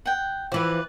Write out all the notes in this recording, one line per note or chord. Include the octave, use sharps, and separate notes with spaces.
F#5 G5
E3 F3 B4 D5